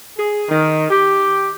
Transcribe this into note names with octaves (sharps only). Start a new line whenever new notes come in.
G#4
D#3
G4